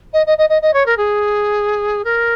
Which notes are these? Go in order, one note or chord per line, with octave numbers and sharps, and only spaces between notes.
D#5
D#5
D#5
D#5
D#5
C#5
A#4
G#4
A#4